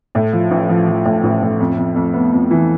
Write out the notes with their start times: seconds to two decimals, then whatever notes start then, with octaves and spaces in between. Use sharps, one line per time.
0.15 A2
0.33 F3
0.51 A1
0.69 F3
0.88 F3
1.05 A2
1.23 A1
1.42 A2
1.60 F2
1.78 F2
1.96 F2
2.14 B3
2.33 F2
2.51 E3